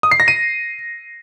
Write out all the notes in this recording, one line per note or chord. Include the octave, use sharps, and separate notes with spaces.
D#6
C7
A#6
D#7